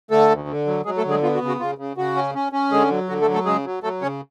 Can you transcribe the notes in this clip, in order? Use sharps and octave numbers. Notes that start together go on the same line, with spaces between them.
D3 A3 A4
D2
D3
F#3
F#3 G#3 G#4
A3 A4
D3
G#3 G#4
B3 F4
F#4
C#3
F#4
C#3 F4
C#3
C#3 F#4
C#4
C#4
C#4
D3 G#3 G#4
F#3
D3 F#4
A3 A4
F#3
A3 A4
C#3 G#3 G#4
F#3
F#3 A3 A4
C#3 C#4 C#5